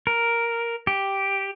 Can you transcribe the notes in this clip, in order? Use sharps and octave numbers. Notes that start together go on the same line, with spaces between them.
A#4
G4